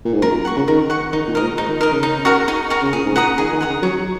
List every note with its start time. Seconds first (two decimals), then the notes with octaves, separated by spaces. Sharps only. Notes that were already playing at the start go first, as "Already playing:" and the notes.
0.05 A#2
0.14 G#2
0.22 F#2 A#4
0.34 A#2
0.45 F#5 C#6
0.56 C#3
0.68 D#3 A#4
0.90 F#5 C#6
1.13 D#3 D#4
1.28 A#2
1.35 G#2 A#4 D#5
1.43 A#2
1.57 G#2 D#4
1.69 D#3
1.80 D#3 A#4 D#5
1.91 C#3
2.03 D#4
2.25 F#4 A#4
2.48 D#4
2.70 F#4 A#4
2.82 C#3
2.93 A#2 G#4
3.04 G#2
3.12 C#3
3.15 A#2 F#5 A#5 D#6
3.38 D#3 G#4
3.53 D#3
3.60 F#5 A#5 D#6
3.69 C#3
3.83 F#3 C#5